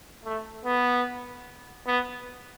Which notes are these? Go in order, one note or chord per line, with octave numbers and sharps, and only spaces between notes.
A3
B3
B3